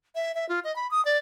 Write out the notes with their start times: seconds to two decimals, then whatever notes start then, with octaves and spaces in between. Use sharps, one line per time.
0.15 E5
0.35 E5
0.49 F4
0.64 D#5
0.76 B5
0.91 D#6
1.05 D5